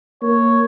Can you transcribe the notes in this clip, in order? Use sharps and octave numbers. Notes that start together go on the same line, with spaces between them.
A#3 C#5